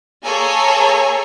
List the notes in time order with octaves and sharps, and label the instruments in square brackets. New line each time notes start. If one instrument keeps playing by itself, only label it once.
[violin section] A#3 G#4 A4 C#5 G#5 A#5